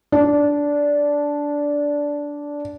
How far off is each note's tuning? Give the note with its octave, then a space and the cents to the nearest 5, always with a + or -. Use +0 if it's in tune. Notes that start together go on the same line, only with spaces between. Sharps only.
D4 -10